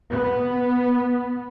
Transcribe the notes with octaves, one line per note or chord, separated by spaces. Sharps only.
B3